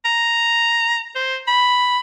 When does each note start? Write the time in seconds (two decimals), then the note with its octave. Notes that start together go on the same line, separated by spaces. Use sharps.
0.05 A#5
1.15 C5
1.47 B5